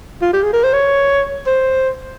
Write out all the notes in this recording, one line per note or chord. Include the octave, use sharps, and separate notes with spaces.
F4
G4
G#4
A#4
C5
C#5
C5